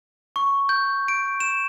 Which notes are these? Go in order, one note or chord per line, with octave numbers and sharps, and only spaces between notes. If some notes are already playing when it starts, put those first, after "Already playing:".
C#6
G6
D7
E7